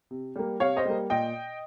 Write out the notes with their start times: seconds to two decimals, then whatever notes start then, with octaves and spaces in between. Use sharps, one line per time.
0.11 C3
0.36 G3 A#3
0.60 C3 C#5 F5
0.77 C5 D#5
0.85 G3 A#3
1.10 A#2 D#5 G5